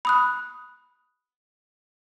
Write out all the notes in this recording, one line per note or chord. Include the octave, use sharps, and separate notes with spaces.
B5 D#6 F#6